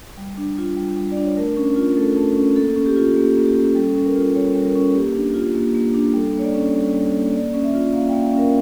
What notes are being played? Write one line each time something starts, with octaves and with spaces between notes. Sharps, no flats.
G3
D4
F4
G3
G3
D5
D4
C#5
A3 A#4
C#4
F4
A3 A4
A3
C#4
A#3 A4
C#4
G4
F4
A#3 G4
A#3
G4
C#4
G3 A4
C#4
A#4
F4
G3 C#5
G3
A#4
C#4
A#3 G4
D4
F4
A#3
A#3
D4
G3 A4
A#3 C#5
D5
C#4
G3
G3
A#3
A#3 D5
C#4
E5
F4
A#3 F5
A#3 G5
F5
C#4 A#4